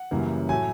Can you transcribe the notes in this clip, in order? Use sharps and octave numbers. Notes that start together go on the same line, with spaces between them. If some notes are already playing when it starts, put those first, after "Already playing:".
Already playing: F#5
F#2 C#3 E3 G3 A#3
A2 F#3 A3 G#5